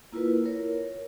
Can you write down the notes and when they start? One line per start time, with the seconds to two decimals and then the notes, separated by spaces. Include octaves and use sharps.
0.12 A#3 E4 F4 A#4 B4
0.46 A#4 C#5